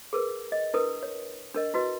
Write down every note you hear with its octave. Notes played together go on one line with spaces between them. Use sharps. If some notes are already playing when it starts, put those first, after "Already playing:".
G#4 A#4 B4
D#5
D4 E4 A#4 B4 D#6
C#5
D4 A#4 D#5
E4 F#4 B4 D#5